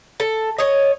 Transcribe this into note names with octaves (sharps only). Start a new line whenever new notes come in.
A4
C#5 D#5